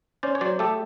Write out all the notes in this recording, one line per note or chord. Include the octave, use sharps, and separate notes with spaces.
C#4 C5 D5
C#5
F#3 C5 D5
A3 G4 A4